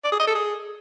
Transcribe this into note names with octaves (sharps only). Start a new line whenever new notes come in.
D5
G#4
D#5
A4
G#4